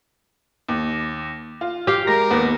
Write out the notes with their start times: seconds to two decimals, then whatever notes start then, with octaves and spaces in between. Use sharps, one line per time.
0.68 D#2
1.61 F4
1.87 G4 F5
2.07 G#3 A#4 A#6
2.31 D#2 B3